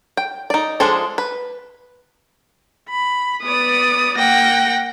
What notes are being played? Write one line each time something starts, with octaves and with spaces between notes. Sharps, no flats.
G5
D#4 D5
F3 G#3 D4 G#4 A4
B4
B5
B3 D5 D#6
A#3 F#5 G5 A#6